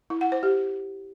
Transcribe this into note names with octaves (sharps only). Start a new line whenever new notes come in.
E4
F#5
C5
G4